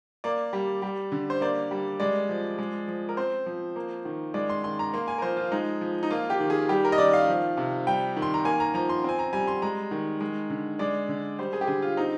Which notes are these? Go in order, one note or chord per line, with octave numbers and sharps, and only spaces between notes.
A#3 D5
G3
G3
D3
C5
A#3 D5
G3
G#3 D5
F3
G#3
F3
A#4
C4 C5
F3
A#3
D#3
G#3 D5
C6
D#3 C6
A#5
A#3 C6
G#5
A#4
F3 C5
F4
G#3 D#4
F3
D#4
A#3 F4
G4
D#3
G#4
G3 G4
A#4
D#5
D#3 D5
F5
F3
C3
G3 G5
D#3
C6
A#5
A#3 G#5
A#5
F3 A#5
C6
C4 G#5
A#5
G3 G#5
C6
G#3 A#5
D#3
G#3
D3
G#3 D5
D3
G3 C5
G#4
G4
D3 G#4
F4
C4 D#4